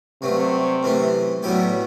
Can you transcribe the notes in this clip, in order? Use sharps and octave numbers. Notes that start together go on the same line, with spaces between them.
G2 C3 F#3 A3
F#2 E3 A3 C4
A2 F#3 G3 B3 E4 G4